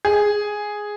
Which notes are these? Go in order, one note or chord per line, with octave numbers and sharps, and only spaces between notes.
G#4